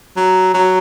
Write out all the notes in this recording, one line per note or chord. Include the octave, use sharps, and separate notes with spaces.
F#3
F#3